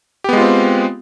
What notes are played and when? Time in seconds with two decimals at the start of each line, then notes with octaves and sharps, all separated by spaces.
0.24 G4
0.29 B3
0.33 G#3
0.37 F4
0.41 C4